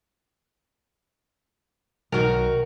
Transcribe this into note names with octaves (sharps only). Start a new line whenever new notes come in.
B1 D#3 F#4 A#4